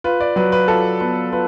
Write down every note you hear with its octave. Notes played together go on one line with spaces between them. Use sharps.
F4 B4
D5
F#3 B4
B4
F4 A4
B3 B4
F4 B4